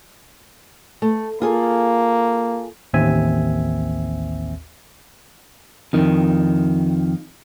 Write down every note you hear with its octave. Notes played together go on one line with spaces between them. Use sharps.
A3
A#3 F4 G#4 A4
A1 D#2 C4 E5 G#5
F2 D#3